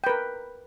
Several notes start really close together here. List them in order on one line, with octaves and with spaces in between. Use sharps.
G5 B4 A#4